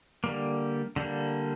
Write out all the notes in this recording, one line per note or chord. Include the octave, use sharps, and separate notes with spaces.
D3 G3 A#3
D3 G3 A#3